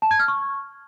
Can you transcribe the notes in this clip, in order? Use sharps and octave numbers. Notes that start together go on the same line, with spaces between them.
A5
G#6
F6
C#6